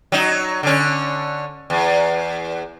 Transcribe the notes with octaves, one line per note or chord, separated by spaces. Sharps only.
F#3 D#4
D3 C#4
E2